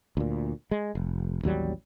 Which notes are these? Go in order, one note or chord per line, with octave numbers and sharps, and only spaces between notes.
D2 A#2
G#3
F1
A1 D#2 F#3 G3